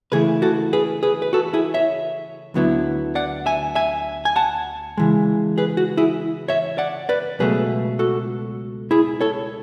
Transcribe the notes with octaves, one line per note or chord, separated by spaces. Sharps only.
C#3 E3 A3 E4 G#4 B4
F#4 A4
G#4 B4
G#4 B4
B4
F#4 A4
E4 G#4
C#5 E5
D2 D3 F#3 B3 E4
D5 F#5
E5 G#5
E5 G#5
G#5
F#5 A5
C#3 E3 G#3
G#4 B4
F#4
E4 G#4
C#5 E5
D5 F#5
B4 D5
C#2 B2 F#3 A3 G#4 B4
F#4 A4
E4 G#4
A4 C#5